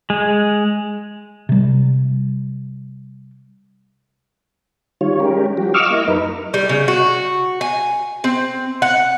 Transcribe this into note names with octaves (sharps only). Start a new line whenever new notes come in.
G#3
C3 G3
D#3 G3 F4 C#5
G3 G#3 C#4 G4 A#4
F3 G3 F#4 G4
D#5 F5 C#6 D6 E6 F6
A#3 E4 D#5
F#2 D#4 A#4 B4
G3
C#3
F#4
G#5
C4
F#5